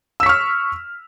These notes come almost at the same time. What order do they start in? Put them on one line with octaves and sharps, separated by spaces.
E6 B6 C#6 F6